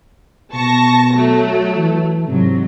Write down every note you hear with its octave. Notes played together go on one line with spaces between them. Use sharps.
B2 A5 C#6 A#6
F#3 A3
E3
G#2 C3 F#3